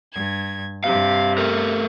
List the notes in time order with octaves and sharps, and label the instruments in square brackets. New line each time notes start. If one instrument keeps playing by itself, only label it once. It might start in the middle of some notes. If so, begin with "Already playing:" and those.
[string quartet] G2 G#6
[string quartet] G2 C3 [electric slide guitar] F5
[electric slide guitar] A3 A#4